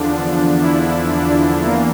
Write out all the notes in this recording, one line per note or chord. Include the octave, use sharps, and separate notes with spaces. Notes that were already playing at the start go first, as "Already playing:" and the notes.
Already playing: E2 D3 F3 D4
E4
D4
E2 E3 A#3